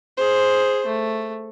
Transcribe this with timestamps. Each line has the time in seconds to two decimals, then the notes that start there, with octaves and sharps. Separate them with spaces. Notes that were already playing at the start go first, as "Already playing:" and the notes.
0.17 G#4 C5
0.86 A3